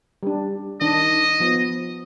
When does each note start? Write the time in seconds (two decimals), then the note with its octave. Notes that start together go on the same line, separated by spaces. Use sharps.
0.23 G3 D4
0.81 D#3 D4 D#5
1.40 F3 B3